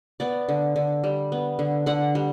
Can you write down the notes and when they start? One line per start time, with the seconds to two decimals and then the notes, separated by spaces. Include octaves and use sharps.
0.20 B3 D5
0.49 D3
0.76 D3
1.04 G3
1.32 B3
1.59 D3
1.86 D3 F#5
2.15 G3